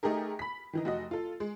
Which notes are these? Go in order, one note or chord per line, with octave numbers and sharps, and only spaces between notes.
A3 D#4 G4 G#4 A#4
B5 B6
D#3 E3 D#4
F1 F#4 D#5
F4 A4
G#3